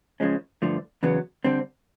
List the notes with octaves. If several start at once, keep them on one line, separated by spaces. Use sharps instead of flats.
C#2 C#3 F3 G#3 C#4
G2 D3 F3 A3
E2 C#3 F#3 B3
D3 G3 C4